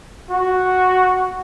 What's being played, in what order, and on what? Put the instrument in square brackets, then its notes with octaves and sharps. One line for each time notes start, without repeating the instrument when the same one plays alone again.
[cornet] F#4